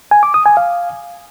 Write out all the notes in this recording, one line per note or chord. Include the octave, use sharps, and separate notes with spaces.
G#5
D6
D#6
G#5
F5